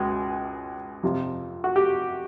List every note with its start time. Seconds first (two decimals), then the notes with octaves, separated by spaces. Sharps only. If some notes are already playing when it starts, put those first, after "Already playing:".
Already playing: C#2 B2 G#3
1.03 F2 C3 F3
1.64 F#4
1.76 G4